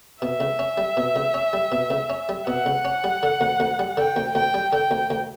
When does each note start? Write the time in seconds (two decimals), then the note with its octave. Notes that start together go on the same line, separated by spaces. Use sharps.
0.22 B2 E5
0.40 C#2
0.59 C#4
0.78 G3
0.97 B2
1.16 C#2
1.34 C#4
1.53 G3
1.72 B2
1.90 C#2
2.10 C#4
2.29 G3
2.47 B2 F#5
2.66 C#2
2.85 C#4
3.04 G3
3.23 D3
3.41 D2
3.60 D2
3.79 G3
3.97 D3 G5
4.16 D2
4.35 D2 G5
4.54 G3
4.73 D3 G5
4.91 D2
5.10 D2